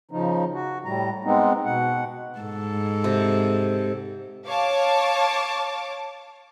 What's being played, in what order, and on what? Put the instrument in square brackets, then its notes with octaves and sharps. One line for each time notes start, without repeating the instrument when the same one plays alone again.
[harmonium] C#3 F3 D#4
F#4
A2 G3 A#5
G#3 B3 C4 D#4
B2 F#5
[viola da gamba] G#2 A4
[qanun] C3
[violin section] C#5 F5 A5 D6